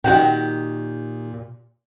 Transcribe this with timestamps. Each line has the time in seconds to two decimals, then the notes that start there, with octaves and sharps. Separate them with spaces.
0.04 A#2 D#3 F#4 G4